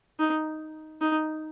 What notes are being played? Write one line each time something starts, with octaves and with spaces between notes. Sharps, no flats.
D#4
D#4